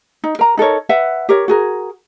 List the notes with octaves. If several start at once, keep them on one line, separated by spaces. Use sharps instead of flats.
D#4
A#4 A#5
D#4 A4 A#4 C#5
B4 E5 F#5
G4 A#4 C#5
F#4 G#4 A#4